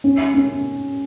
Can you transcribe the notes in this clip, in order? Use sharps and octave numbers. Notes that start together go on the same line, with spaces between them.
C#4
C#4